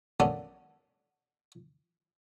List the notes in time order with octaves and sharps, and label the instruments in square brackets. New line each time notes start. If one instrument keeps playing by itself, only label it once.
[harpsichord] F#3 A#3 B3 C#4 D4 A4